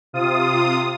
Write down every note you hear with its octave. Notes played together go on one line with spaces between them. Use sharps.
C3 F4 D#6